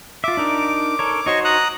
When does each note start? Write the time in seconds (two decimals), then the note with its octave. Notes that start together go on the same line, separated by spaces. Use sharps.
0.24 F4 E5 D6
0.37 D4 D#4 A#4
0.99 A4 A#4 C#5
1.26 D#4 F#4 C5 C#5 D#5 C#6
1.45 A#5 D#6 F#6